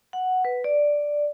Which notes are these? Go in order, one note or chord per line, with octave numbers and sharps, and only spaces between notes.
F#5
B4
D5